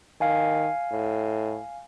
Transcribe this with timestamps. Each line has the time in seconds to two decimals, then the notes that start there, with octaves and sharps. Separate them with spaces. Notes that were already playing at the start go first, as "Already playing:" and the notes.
0.21 D#3 F5 G#5
0.92 A2